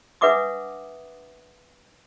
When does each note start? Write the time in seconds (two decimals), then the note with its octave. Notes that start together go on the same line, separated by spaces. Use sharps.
0.21 D4 B4 E5 F#5 D6 D#6